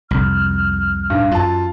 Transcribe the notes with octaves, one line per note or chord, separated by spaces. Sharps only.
C2 F2 F6
G2
F#2 F4 A5